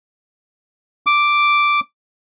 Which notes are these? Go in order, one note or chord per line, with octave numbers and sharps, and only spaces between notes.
D6